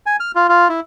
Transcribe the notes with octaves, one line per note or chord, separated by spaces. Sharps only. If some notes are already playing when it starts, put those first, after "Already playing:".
G#5
F6
F4
F4
E4